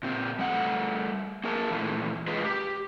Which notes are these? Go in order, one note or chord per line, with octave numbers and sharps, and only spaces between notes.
A#2 C4
G3 A3 F#5
A#3 G#4 A#4 F5 A5
A#2 E3 A3
G#3 F4 G#4 B4 D#5
G4